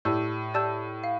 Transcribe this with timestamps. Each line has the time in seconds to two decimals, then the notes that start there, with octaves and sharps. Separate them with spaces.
0.05 A2 G4 D5 A5 E6 G6
0.54 G4 D5 A5 E6 G6
1.04 F5